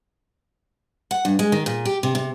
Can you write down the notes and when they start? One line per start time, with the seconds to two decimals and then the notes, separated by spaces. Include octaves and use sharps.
1.11 F#5
1.25 G2
1.39 G#3
1.52 D#3
1.66 A#2
1.85 G4
2.03 C3
2.15 C3